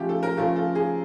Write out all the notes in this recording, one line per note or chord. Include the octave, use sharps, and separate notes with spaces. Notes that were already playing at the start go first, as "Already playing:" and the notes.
Already playing: C#3 F3 A3 C#4 G4
A4
A#4
C#3 F3 A3 C#4 A4
A4
G#4